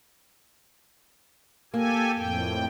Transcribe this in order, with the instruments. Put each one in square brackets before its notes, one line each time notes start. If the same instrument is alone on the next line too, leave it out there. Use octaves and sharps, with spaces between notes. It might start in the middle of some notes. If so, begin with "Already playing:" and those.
[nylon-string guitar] A#3 [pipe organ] G4 A4 G#5
[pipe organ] F2 A2 G5